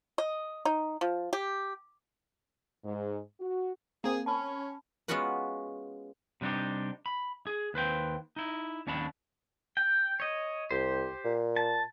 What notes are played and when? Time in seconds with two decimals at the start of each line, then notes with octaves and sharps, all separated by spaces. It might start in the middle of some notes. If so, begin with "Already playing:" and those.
0.18 D#5
0.65 D#4
1.01 F3
1.33 G4
2.84 G#2
3.41 F#4
4.04 A#3 C4 G#4
4.26 C#4 A5 B5
5.08 G#3 B3 C#4 F4 F#4 B4
6.41 C3 G3 D4 D#4 G4
7.06 B5
7.47 G#4
7.74 D#2 B4 C5 G5
8.36 D#4 E4
8.87 D#2 C#4 D4 A5 B5
9.77 G5
10.20 C#5 D#5
10.71 C2 G4 C5
11.24 A#2
11.56 A5